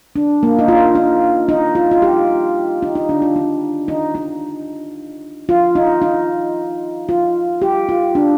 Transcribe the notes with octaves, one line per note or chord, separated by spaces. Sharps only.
D4
A#3
D#4
F4
D#4
D#4
F4
F4
G4
D#4
D#4
D4
F4
D#4
D#4
D#4
F4
D#4
D#4
F4
G4
F4
D4